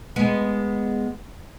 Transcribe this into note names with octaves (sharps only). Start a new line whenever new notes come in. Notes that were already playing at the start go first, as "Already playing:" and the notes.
G#3 B3